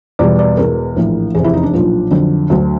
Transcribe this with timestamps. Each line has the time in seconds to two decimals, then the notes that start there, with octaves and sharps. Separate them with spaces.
0.19 E2 B2 G3 D5
0.39 D5
0.57 E1 E2 B2 A#4
0.96 A#1 A2 E3
1.34 F1 E2 C3 G#4
1.44 E4
1.54 D#4
1.63 D4
1.73 B1 A#2 F3
2.11 F2 D3 F#3
2.50 D2 D3 F#3